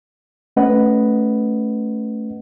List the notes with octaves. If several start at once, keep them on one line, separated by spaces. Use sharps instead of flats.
A3 C#4 B4 D#5 F#5